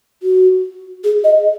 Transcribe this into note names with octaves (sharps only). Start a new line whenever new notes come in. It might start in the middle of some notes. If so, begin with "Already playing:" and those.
F#4
G#4
D#5